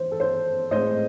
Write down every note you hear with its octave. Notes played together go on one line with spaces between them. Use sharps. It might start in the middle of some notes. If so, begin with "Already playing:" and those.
Already playing: E3 C5
A4
C5
A2 G#3 C4 C5 D#5